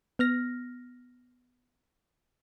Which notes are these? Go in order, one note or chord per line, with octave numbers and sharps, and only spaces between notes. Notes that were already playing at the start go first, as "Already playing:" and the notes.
B3 F6 A#6